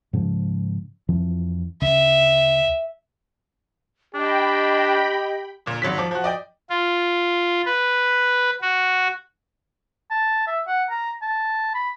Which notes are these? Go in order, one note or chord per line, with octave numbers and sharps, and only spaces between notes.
G#2 C#3 F3
F2 E3 F3
D2 C#3 E5
D4 G4 D#5 G5 B5
G1 A#2
G#1 F#3 B6
F3 D6
F3 F#4
D5 D#5 G5
F4
B4
F#4
A5
E5
F#5
A#5
A5
B5